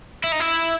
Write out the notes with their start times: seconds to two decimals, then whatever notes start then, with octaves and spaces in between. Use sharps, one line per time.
0.24 E4
0.32 D#4
0.40 E4